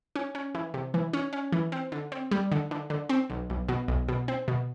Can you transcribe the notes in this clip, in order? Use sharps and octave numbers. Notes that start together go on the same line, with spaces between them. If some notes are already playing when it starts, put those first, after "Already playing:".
C#4
C#4
E3
C3
E3
C#4
C#4
E3
C4
D3
C4
G3
D3
D3
D3
C4
B1
B1
B2
B1
B2
C4
B2